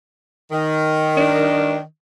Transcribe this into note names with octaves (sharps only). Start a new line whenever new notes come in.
D#3
D4